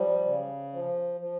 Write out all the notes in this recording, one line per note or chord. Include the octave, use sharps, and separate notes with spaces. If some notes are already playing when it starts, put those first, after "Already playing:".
Already playing: F3 G3
C#3
F3
F3